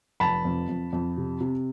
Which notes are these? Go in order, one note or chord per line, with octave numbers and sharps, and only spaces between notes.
F1 A5 B5
F2
F2
F2
C3
C3